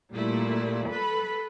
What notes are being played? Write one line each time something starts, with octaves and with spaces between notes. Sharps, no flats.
A#2 G3 A3 E4
A4 B4 B5